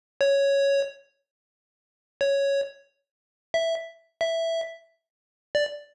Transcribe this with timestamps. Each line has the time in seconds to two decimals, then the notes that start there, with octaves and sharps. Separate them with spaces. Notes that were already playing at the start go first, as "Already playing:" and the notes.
0.21 C#5
2.21 C#5
3.54 E5
4.21 E5
5.55 D5